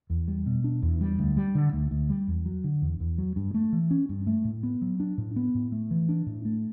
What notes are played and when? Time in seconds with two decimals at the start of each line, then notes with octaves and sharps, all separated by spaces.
0.10 E2
0.28 G3
0.46 B2
0.64 D4
0.82 E2
1.01 G3
1.19 D2
1.37 G3
1.55 D3
1.73 D2
1.91 D2
2.10 G3
2.28 E2
2.46 F#3
2.64 D3
2.82 E2
3.00 E2
3.18 F#3
3.36 G2
3.54 A3
3.73 E3
3.91 C#4
4.09 G2
4.27 A3
4.45 A2
4.63 B3
4.82 F#3
5.00 D4
5.18 A2
5.36 B3
5.55 A2
5.72 A3
5.91 E3
6.09 D4
6.26 A2
6.45 A3